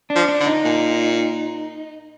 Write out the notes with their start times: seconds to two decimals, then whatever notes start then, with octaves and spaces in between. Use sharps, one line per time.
0.10 D4
0.16 F3
0.29 D4
0.40 D3
0.46 D#4
0.65 A#2